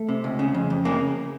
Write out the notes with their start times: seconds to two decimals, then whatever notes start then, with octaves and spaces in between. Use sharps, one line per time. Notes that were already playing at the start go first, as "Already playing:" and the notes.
Already playing: A3
0.09 C3
0.24 C#2
0.39 C#3
0.54 F2
0.70 F2
0.85 C#3 A#3